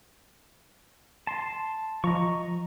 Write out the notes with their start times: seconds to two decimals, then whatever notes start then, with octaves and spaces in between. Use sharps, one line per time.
1.27 A5 C6
2.04 F3 D#5 A#5 C#6